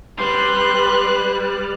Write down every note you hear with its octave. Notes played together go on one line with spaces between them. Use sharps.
G3 B4 C6 F#6